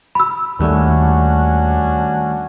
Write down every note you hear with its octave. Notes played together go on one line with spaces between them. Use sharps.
B5 E6
D#2 D#3 G3 A3 C#4 D4 F#4